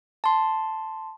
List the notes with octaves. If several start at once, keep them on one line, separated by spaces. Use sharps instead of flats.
A5 C6